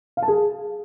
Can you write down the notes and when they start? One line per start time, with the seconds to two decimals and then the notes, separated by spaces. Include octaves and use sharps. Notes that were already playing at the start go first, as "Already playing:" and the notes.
0.17 F5
0.22 A5
0.28 G#4